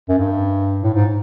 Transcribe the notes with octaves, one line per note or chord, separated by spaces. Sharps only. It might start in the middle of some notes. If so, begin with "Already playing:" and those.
F#2
G2
A2
G#2